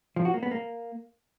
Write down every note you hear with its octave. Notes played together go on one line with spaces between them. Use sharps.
F3
F#4
A#3
B3
A#3